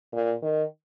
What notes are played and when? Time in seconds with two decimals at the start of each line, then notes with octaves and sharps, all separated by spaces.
0.13 A#2
0.42 D#3